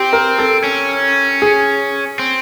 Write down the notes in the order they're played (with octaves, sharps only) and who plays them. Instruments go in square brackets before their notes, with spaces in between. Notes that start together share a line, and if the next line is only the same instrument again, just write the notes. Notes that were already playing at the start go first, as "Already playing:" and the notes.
Already playing: [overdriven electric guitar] C4 [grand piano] G4
[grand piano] A#4
A4
[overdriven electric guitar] C#4
[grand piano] G#4
[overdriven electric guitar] C4